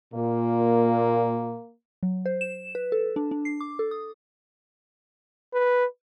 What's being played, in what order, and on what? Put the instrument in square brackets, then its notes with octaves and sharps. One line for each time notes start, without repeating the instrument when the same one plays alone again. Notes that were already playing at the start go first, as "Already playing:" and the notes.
[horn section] A#2 [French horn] A#3
[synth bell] F#3
C5
E7
B4
A4
D4
D4
C7
D6
A4
D#6
[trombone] B4